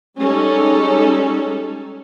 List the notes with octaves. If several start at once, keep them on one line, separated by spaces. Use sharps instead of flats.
G3 G#3 C#4 D#4 A4